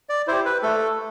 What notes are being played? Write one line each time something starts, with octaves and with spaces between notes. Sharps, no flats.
D5
E4 G4 C5
B4
A3 A4